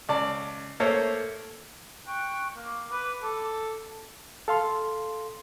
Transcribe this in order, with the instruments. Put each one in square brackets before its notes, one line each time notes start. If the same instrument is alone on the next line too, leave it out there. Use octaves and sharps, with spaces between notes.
[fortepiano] C#2 D5 A5
A3 A#3 A4 C5 C#5
[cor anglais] G5 [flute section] C#6 F#6
[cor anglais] A#3 [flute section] D6
[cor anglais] B4
A4
[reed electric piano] A4 F5 C6